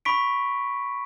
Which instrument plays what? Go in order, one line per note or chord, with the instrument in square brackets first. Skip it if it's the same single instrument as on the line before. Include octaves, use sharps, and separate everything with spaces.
[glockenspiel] B5 C#6 B6 D7